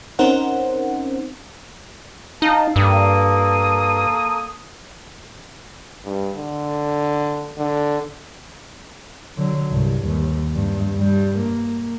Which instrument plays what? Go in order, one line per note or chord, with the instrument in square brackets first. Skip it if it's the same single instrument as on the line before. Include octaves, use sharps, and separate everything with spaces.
[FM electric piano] C4 C#4 D#4 A#4 C5 F#5
[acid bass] D#4 [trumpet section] F5 A5
[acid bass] G2 [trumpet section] A#3 A4 D#6
[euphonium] G2
D3
D3
[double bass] D3 F#3
C2 G2
D#2
G2
G2 G3
A#3